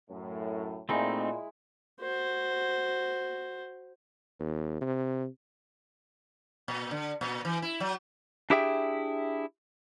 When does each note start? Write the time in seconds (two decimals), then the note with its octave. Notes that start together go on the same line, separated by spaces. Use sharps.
0.10 F#2 A2
0.89 A#2 G#3 A3 C4 D#4 E4
2.00 F#4 C5
4.40 D#2
4.81 C3
6.68 A#2
6.91 D3
7.21 A#2
7.45 E3
7.62 E4
7.80 F#3
8.50 D4 E4 G4 G#4 E5 G5